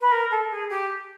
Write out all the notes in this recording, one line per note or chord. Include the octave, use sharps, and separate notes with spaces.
B4
A#4
A4
G#4
G4